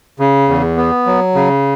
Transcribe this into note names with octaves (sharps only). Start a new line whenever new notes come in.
C#3
E2
B3
F#3
C#3